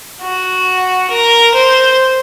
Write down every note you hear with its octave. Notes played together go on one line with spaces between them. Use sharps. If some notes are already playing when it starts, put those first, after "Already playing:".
F#4
A#4
C5